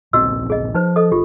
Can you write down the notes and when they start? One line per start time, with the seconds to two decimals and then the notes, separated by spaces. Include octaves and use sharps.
0.13 D1 A#1 C4 F#4 D#5 E6
0.50 G#4 D#5
0.74 F3 D#4 B4 C5
0.96 A4 D#5 D#6
1.12 G1 F4 G4 G#4